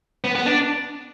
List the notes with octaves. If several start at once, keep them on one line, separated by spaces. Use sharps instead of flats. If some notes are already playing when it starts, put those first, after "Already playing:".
B3
B3
D4